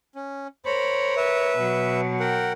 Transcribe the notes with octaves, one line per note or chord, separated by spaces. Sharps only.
C#4
A#4 C5 C#5 B5
B4 E5
B2 F#3
A#4 F#5 G5